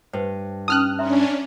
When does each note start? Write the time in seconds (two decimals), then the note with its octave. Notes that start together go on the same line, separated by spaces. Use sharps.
0.13 G2 C5
0.68 C#4 D#4 A5 D#6 F6 F#6
0.99 C#4 D4 E5 A#5 C6